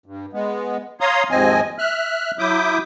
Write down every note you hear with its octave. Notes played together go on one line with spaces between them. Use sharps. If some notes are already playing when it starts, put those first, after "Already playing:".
G2
G#3 B3
C#5 F5 A#5 C6 D#6
D#2 G#2 F3 C4 D#5 G#5
E5 F6 F#6
F#3 E4 E5 D6 D#6 G6